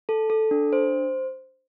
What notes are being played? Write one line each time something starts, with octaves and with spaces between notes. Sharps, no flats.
A4
A4
D4
C5